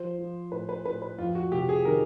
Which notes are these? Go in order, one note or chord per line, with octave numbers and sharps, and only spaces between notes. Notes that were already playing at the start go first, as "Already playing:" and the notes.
Already playing: F3 C5
F3
A2 B4
B4
A2 B4
B4
F2 F4
F#4
C3 G4
G#4
D#3 A#4